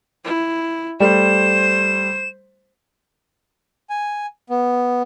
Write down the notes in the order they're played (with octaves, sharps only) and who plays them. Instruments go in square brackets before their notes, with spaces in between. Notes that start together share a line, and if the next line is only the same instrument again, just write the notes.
[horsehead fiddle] E4
[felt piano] G3 A3 [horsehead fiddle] C5 [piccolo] E7
[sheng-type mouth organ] G#5
B3